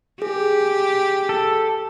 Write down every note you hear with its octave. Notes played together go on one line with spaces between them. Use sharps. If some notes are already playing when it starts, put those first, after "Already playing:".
G4 G#4
A4